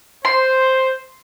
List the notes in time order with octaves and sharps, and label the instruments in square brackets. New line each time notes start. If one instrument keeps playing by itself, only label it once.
[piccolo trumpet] C5 [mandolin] C6